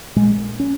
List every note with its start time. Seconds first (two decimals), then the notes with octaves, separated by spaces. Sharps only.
0.16 A#1 A#2 G#3
0.60 C#4